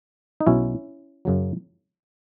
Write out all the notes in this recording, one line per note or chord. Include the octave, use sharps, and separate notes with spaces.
D#4
B1 B2 F#3 C#4 E4
F#2 C#3 F#3